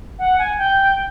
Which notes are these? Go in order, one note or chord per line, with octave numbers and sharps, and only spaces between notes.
F#5
G#5
G5